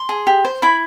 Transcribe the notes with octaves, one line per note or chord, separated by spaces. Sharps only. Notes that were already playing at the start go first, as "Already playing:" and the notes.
Already playing: C6
G#4
G4
C5
E4 B5